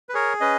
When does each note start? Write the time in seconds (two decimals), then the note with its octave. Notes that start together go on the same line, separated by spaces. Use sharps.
0.09 B4
0.14 G#4 A#4 C#5
0.40 C#4 B4 D#5